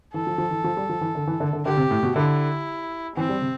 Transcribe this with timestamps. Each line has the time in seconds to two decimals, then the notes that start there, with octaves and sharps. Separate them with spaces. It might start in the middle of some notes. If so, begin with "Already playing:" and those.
0.14 E3 A4
0.27 F3
0.38 F3
0.51 E3
0.64 F3
0.77 G3
0.89 F3
1.01 E3
1.15 D3
1.27 E3
1.40 D3
1.53 D3
1.65 D3 G4
1.77 C3
1.91 A2
2.03 B2
2.16 D3 E4
3.16 E3 C4
3.29 G3
3.42 C3